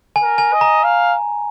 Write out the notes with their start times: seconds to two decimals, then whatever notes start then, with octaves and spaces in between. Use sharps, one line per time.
0.16 G#5
0.23 A#4
0.38 G#5
0.53 D#5
0.61 A#5
0.84 F5